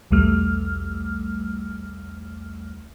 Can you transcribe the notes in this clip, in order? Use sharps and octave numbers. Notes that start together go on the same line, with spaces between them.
B1 E2 G3 A3 F6